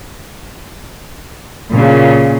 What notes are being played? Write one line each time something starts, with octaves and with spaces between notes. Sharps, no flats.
A#2 C#3